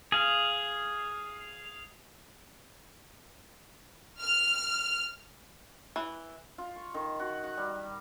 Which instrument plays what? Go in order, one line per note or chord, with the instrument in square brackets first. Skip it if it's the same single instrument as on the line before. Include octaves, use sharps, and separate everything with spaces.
[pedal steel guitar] G#4 F5
[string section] F6
[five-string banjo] E3
[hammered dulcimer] F4
C#6
D#3
F#4
F#5
G3